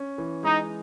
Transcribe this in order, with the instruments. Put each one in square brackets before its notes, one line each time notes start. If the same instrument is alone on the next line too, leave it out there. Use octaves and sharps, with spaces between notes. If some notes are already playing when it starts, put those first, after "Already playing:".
Already playing: [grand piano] C#4
E3
[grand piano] G#3 [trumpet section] D#4